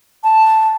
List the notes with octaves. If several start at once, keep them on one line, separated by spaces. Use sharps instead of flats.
A5